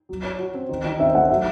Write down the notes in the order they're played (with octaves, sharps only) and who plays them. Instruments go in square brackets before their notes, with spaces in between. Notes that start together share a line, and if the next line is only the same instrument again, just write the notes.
[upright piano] F#3
C#5
F#4
C4
D#3
D#3
[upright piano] C4 [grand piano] E5
[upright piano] A3 [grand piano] F#5
[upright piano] F#3 [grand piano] E5